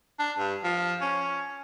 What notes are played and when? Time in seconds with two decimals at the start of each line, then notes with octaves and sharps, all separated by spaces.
0.19 D4
0.39 G2
0.64 F3
1.01 C#4